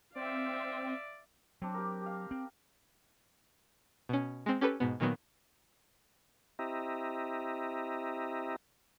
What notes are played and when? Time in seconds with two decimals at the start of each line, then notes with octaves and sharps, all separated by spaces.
0.16 C4 D5 E5 F5
1.62 F#3 C4 D4
1.74 G4 A#4
2.02 G4 F5
2.31 C4
4.09 B2 C#4
4.46 G#3 C4
4.61 C#4 G4 A4 B4
4.80 G#2 B2 B3
5.00 A#2 D#3 F#3 B3
6.59 C4 E4 G4 D#5 E5 A#5